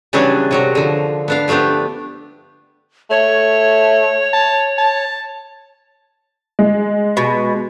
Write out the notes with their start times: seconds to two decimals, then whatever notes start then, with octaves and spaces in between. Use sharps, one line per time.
0.13 C#3 E3 F#3 G3 D4 G#4
0.51 C3 F#3 A#4
0.75 D3 F3
1.28 B3 D4 F5
1.48 F3 A3 B3 D4 G4
3.11 A3 C#5
4.33 A5
4.78 A5
6.59 G#3
7.17 B2